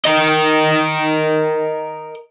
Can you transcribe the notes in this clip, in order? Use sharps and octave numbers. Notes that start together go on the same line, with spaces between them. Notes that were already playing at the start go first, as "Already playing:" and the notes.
A#4 D#5